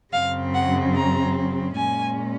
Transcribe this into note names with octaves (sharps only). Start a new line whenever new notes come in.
F#2 C#3 F#3 C4 F5
F#5
A#5
A#2 G#3 C#4 G#5